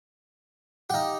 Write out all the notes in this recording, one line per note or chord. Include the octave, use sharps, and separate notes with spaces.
D#4 G4 F5 F#5